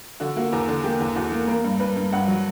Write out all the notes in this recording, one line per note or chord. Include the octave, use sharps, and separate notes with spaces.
D3 F#4
A#3 F#4
E2 A#4
D3
A#3 G4
E2
E2 F#4
A#3
A#3 A#4
G2
G2 B4
G2
G2 F#5
F#3